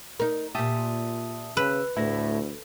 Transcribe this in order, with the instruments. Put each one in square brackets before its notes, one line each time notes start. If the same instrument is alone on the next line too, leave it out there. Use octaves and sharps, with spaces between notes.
[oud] D#4 A#4
[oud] A#2 G4 [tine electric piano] E5 A5 D#6
[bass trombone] C#3 [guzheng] B4 [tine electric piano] E6
[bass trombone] D2 [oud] A2 [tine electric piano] E4 A#6